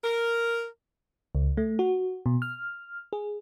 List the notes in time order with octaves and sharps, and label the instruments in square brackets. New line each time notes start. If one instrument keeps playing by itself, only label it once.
[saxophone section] A#4
[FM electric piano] C#2
A3
F#4
B2
F6
G#4